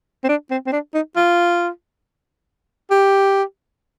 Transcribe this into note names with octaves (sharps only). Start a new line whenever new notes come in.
C4
D4
C4
C4
D4
D#4
F4
G4